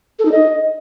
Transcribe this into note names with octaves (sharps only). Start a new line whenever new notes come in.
A4
D#4
D#5